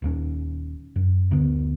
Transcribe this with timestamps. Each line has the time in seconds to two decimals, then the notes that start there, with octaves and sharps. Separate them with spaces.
0.02 D#1 D#2 C#4
0.96 F#2
1.31 D2 D3 B3